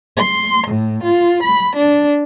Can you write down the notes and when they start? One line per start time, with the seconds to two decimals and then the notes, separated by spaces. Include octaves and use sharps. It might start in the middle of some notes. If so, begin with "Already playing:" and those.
0.17 C6
0.68 A2
1.03 F4
1.43 B5
1.77 D4